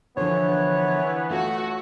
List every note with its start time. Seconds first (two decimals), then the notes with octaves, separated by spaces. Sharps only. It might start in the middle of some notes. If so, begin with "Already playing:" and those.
0.17 D3 E3 F3 B3 C#5
1.30 A3 F4 F#4